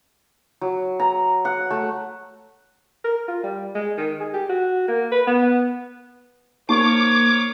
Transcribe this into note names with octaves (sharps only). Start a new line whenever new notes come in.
F#3
A#5
F#5
A3
A#4
F4
G3
G#3
D#3
G#4
G4
F#4
A#3
B4
B3
A#3 D#4 G4 A#4 C5 C#5 D6